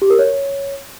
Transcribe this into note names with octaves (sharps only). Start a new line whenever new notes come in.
G4
A#4
C#5